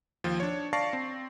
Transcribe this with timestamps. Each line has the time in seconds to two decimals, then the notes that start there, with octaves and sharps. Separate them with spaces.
0.24 D#2 F3
0.40 D4 C#5
0.73 D5 F5 A5 C#6 A#6 C7
0.93 C4